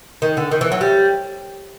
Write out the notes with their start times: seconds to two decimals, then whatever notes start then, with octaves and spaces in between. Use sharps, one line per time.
0.22 D#3
0.37 D3
0.51 D#3
0.61 E3
0.72 F#3
0.81 G3